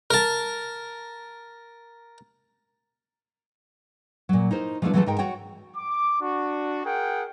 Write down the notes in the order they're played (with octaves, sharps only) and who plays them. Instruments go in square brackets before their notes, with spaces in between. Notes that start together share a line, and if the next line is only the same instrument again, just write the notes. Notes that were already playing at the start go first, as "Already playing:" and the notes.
[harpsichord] A#4 A5
[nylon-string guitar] A#2 F#3
D#4 E4 A#4 C5
F3 G3 A3 B3 D4 E4
E3 F#3 A3 E4 F4 A4
G#2 D#4 A#4 G5
F#4 C#5 F#5 G5
[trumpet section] D6
D4 F#4
G#4 A#4 F#5 G5